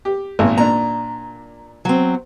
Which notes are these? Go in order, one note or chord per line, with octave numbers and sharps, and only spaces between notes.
G4
G#1 A#2
A#2 D4 A#5
F#3 C4